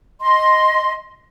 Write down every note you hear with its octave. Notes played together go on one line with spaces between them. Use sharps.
D#5 C6